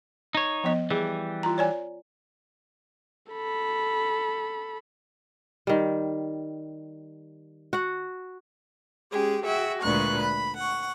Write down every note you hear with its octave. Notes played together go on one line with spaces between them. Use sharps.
D#4 C#5
F3 B3 D#5
E3 G3 G#4
F4 A#5
C#5 D5 G#5
A4 B5
D#3 G3
F#4 F#5
G#3 C#4 G4 G#4
F#4 G#4 E5 G5
D2 A#2 G#3 B4 C#6 F#6
B5
F#5 C#6